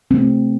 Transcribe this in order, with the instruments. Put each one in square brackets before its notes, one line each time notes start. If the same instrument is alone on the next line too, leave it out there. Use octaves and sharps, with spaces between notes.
[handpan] C3 E3 A3 C4